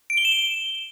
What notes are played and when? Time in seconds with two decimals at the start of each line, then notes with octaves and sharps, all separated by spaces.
0.10 D7
0.17 G7
0.25 E7
0.32 G7